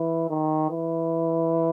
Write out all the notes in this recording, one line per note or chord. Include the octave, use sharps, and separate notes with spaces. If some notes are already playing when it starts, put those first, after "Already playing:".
Already playing: E3
D#3
E3